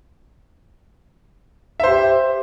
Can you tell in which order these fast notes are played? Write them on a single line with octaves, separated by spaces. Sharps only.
E5 C5 G4